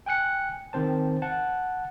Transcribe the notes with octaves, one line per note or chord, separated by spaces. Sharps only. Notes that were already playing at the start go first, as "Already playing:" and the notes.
G5 G#5 F#6 C#7
D#3 C4 C5 A5
F#5 A5